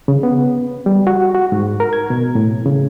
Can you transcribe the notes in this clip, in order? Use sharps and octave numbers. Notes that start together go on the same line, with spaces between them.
C#3
B3
G3
F#4
F#4
G#2
A#4
G#6
B2
A2
C#3